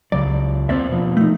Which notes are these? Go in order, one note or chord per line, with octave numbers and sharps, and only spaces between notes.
C#2 C#3 F#3 D5
E2 A#3 C4 D5 E5
B2 F3
A3 D#4